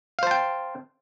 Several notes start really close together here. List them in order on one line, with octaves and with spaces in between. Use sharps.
F5 C5 A5 G5